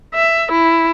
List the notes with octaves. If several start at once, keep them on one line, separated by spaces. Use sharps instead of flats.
E5
E4